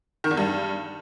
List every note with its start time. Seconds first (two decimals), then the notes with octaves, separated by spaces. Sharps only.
0.24 D#3
0.31 E2
0.37 G2